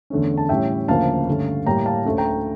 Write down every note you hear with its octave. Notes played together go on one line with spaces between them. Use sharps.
E2 D3 A3 C#4
A5
A2 E3 G3 C#4 E5 G5
D2 C#3 F3 A#3 C#4 F5 A5
G2 D3 A3 C#4
A2 G3 A#3 G5 A#5
F5 A5
D2 D3 A3 C#4
G5 A#5